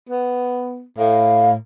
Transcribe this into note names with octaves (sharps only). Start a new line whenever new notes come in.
B3
A2 F5